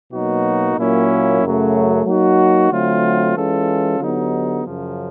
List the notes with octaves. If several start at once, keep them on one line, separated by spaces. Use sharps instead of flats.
B2 F#3 A#3 D#4 F#4
A#2 F#3 A#3 C#4 E4
F#2 C#3 F#3 A3
F#3 A#3 D#4 F#4
D3 F#3 A3 C4 F4
E3 G#3 C#4 F4 A4
D3 F#3 B3 D#4 G4
F#2 C#3 F3